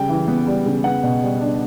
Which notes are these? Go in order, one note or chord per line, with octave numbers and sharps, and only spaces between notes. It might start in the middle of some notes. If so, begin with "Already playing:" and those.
Already playing: C#3 G3 G5
E3
B3
G3
C#3
B3 F#5
B2
G3
D4